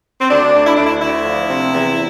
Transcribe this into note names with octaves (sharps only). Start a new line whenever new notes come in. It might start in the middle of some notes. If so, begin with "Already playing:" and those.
C4
D2 D4
D2
E4
D2 D4
E4
D2 E4
F3
C3
E2